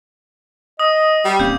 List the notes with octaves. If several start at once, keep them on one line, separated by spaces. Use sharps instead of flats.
D#5 D#6
G3
D1 A#3 C4 C#4 G6